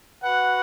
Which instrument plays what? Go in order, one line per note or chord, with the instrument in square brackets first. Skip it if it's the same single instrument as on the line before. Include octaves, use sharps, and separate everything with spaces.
[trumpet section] F#4 B4 F#5